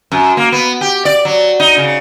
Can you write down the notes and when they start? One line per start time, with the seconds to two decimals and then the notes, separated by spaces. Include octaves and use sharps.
0.12 F#2
0.37 A#3
0.52 B3
0.81 G4
1.05 D5
1.25 F#3
1.60 D#4
1.78 C#3